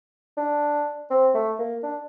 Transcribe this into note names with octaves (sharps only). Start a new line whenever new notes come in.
D4
C4
A3
A#3
D4